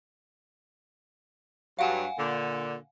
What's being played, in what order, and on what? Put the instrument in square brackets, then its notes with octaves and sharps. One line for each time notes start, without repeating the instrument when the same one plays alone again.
[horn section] G2 F#3 [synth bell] F5 F#5 G#5
[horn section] A#2 D3